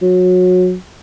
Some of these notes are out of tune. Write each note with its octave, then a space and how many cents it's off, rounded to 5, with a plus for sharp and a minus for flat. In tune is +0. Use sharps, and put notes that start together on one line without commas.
F#3 -25